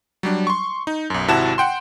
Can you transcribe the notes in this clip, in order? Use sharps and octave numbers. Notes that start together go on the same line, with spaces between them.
F#3 G3 D4
C6 C#6
D#4
B1 F#2
G#1 C3 E4 F#4 A5 E7
F#5 G5 C6